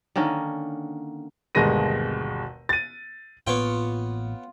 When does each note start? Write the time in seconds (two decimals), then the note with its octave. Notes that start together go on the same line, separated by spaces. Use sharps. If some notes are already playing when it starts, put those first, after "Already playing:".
0.16 D3 D#3 A#3 C#4
1.55 G1 D#2 B2 G#3 A#6 D#7
2.69 A6 D#7
3.47 A1 A2 A#3 B3 F4 C#5 G5